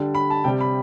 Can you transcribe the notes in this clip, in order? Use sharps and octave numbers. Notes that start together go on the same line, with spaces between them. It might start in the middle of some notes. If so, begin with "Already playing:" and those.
Already playing: D3 G3
B5
A5
C3 G3 G5
B5